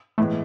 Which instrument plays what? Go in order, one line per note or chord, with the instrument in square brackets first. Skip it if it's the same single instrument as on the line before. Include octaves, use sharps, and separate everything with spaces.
[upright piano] A2 E3 G#3 B3 [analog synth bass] A3